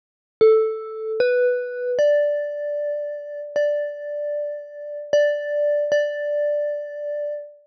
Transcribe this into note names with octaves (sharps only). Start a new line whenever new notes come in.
A4
B4
D5
D5
D5
D5